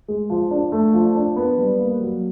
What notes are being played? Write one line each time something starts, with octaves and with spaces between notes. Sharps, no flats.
G#3
F3
D4
A3
F3
D4
B3
G3
A#3
F#3